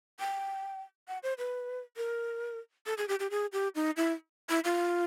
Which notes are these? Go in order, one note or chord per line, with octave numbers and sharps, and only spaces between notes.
G5
F#5
C5
B4
A#4
A4
G#4
G4
G4
G#4
G4
D#4
E4
E4
F4